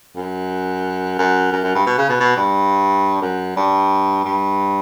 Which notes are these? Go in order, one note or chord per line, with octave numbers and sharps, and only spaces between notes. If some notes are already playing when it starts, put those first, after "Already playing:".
F#2
F#2
F#2
F#2
G2
B2
C#3
B2
B2
G2
F#2
G2
G2